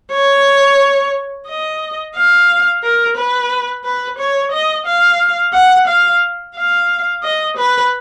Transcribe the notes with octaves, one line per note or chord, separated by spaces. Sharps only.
C#5
D#5
F5
A#4
B4
B4
C#5
D#5
F5
F#5
F5
F5
D#5
B4